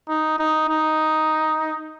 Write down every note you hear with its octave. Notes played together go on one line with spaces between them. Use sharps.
D#4
D#4
D#4